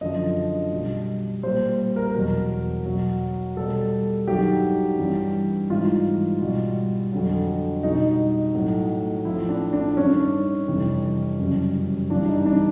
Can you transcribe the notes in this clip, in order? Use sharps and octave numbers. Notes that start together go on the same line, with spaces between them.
F#2 D3 F3 D#5
B2 G3
A#2 G3 C5
A#4
E2 B2 F#3 A#4
B2 F#3
B2 G3 A4
G2 D#3 F#3 G4
G2 E3 G3
G#2 E3 G3 F4
B2 G3
F2 D3 F#3
B2 G3 D#4
A2 F#3
A2 F3 E4
D4
D4
G2 D#3 G3 C#4
F2 C3 E3 G3
F#2 C#3 E3 G3
G2 E3 G3 D4
D#4
D4